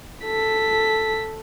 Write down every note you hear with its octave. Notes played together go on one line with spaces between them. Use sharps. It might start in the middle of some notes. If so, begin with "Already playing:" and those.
A4 B6